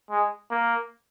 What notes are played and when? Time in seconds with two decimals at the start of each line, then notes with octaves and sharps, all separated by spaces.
0.10 G#3
0.51 A#3